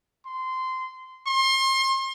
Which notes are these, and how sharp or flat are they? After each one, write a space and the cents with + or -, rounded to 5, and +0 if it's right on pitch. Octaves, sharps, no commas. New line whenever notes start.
C6 -15
C6 +35